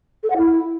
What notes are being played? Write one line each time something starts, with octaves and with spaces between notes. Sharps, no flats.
A4
F#5
E4